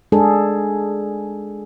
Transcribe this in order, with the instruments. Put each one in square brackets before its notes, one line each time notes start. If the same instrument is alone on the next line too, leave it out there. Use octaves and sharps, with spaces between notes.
[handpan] G#3 D4 G#4 A4